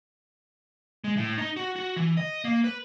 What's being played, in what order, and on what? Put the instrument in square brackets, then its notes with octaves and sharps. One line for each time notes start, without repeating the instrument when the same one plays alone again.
[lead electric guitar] G#3
A2
D#4
F#4
F#4
E3
D#5
A#3
B4